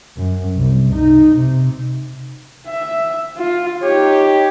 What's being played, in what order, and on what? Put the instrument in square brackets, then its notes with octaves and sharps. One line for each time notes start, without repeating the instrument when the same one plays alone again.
[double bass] F#2
C2
D#4
C3
[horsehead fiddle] E5
F4
[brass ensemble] D#4 G4 [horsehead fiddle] C#5